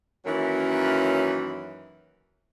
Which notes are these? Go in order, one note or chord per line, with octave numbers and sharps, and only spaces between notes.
F#2 D#3 E3 F#3 A#3 C#4